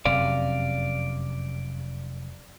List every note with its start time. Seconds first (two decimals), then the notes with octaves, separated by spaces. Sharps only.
0.05 F1 F#2 C3 D5 F5